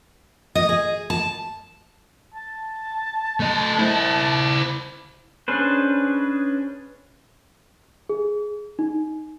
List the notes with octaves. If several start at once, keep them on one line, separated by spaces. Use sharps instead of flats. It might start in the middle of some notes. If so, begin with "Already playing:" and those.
D#5
G#4
A5
A5
A3 D#5
E4 C5
C#4 D4 G#4 B4 C5
G#4
D#4